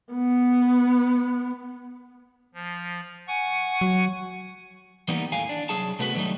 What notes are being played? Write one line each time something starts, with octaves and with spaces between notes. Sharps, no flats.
B3
F3
F#5 G#5 C#6
F#3
E3 G3 A#3 B3 D#4
D#2 A2 F5 G#5
D4
C2 F#3 G#4 A5
C3 A3 B3 F#4 B4
D3 D#3 F#3 G3 A3 D#4